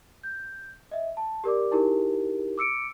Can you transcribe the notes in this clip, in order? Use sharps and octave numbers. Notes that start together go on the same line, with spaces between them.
G6
D#5 E5
A5
G4 A#4 D5 D6
D#4 E4 G4 G#4 A#4
D6 E6 C#7 D7